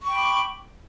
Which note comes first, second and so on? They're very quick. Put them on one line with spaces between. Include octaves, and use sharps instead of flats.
C#6 G5 B5 D6